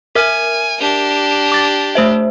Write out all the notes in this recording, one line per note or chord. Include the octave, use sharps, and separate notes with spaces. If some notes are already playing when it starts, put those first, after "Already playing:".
A#4 E5 G#5 F6
D4 G4
D6 A6
A3 C5 E5